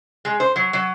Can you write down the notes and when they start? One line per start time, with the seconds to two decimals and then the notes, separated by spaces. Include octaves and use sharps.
0.25 G#3
0.40 C5
0.56 F#3
0.73 F#3